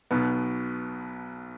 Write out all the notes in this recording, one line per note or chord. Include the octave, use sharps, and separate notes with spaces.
B1 B2 B3